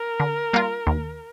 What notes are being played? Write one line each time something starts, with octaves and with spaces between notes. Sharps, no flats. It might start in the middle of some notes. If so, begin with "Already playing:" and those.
Already playing: A#4
D3
G3 A#3 F4
D#2